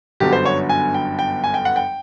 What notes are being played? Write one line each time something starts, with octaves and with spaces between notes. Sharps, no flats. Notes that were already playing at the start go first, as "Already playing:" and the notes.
G1 F#2 D3 F#3 B3 G4
C5
C#5
G#5
G5
G5
G#5
G5
F#5
G5